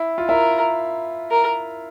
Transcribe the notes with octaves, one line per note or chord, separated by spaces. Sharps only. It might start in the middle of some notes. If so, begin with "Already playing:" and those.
Already playing: E4
F4
E4 A#4
A#4